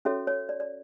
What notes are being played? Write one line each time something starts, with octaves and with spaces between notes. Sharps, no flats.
C#4 F#4 A4 C#5 E5
C#5
D5
D5